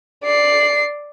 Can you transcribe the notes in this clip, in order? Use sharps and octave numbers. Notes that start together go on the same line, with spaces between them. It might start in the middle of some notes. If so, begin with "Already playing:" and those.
D5 C7